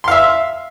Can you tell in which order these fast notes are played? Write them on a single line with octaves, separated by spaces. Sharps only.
C6 F5 E5